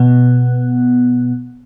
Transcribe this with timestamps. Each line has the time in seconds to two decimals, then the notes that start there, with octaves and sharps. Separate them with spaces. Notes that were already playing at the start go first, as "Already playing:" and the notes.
Already playing: B2 B3